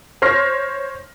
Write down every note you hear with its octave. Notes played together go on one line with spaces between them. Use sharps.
C5 C#5 F6 A#6